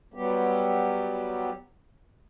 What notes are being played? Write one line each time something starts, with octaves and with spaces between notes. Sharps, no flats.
F#3 G3 B3 G4